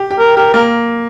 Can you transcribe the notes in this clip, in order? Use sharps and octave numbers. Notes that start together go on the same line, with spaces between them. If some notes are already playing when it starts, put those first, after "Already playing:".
Already playing: G4
G4
A#4
G4 A#4
A#3 A#4